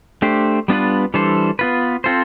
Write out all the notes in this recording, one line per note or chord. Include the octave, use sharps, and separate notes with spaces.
A3 D4 G4 C5
G3 B3 D4 F4 B4
E3 G3 D4 A4 C5
B3 F4 B4
C4 F4 A4 C5